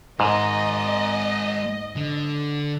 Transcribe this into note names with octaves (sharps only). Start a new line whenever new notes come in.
G#2 G#3 A#4 D#5
D3